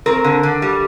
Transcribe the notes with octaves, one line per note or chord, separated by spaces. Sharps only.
C4 A#4
D3
D3
G3